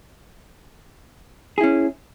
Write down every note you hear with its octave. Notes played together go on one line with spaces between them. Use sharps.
C#4 E4 G#4